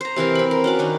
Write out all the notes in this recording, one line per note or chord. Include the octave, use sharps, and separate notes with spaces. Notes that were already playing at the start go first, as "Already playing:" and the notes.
C5 A#5
C3 E3 A#4 F5
C4 B5
A#4
C#4 F#4 D5
D#3 D4 C#5